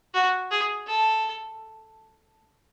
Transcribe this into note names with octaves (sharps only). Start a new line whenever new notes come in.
F#4
G#4
A4